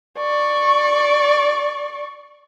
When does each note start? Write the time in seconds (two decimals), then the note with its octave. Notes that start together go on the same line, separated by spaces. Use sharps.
0.17 D5 C#6